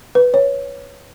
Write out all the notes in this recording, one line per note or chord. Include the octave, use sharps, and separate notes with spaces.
B4
C#5